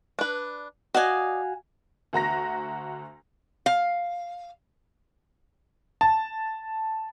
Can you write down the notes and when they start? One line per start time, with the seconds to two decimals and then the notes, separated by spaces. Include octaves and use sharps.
0.19 D4 B4
0.94 F#4 D5 D#5 F5 G#5
2.13 D2 F#4 A#5 A#6
3.66 F5
6.01 A5